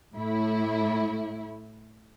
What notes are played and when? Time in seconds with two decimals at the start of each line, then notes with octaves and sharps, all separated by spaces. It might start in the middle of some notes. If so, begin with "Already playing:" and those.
0.14 A2 E4